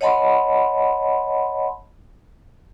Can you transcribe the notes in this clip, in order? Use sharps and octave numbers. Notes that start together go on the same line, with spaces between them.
C#5 D#5 F#5 A5 B5 C6